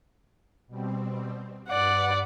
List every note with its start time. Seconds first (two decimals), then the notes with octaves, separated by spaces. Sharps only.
0.67 B2 G3 C4
1.69 G2 B4 D5 F#5